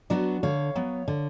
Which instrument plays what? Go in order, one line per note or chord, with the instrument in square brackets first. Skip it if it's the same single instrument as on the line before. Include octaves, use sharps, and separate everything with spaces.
[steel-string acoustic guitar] F#3 B3 D4 F#4
D3 C#5 F5
F#3 B3
D3